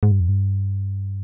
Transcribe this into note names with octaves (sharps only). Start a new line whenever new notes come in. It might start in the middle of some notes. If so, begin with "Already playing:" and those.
G#2
G2
F2
G2